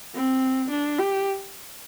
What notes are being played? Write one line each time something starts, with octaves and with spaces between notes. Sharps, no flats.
C4
D4
G4